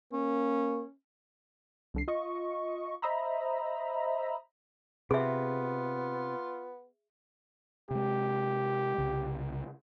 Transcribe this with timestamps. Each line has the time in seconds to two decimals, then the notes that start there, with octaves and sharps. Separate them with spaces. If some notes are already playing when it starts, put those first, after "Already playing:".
0.13 A#3 C#4
1.94 C2 D3 C7
2.08 F4 D#5 C#6
3.02 C5 D#5 E5 A#5 B5
5.11 C3 B3 F4 G#4 E5
7.91 C3 G#3 G4
8.98 C2 C#3